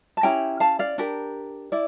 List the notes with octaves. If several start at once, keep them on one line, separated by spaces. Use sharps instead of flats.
A5
C#4 E4 G4 G5 A#5
F5 A5
D5 F5
D4 G4 A#4
E4 D5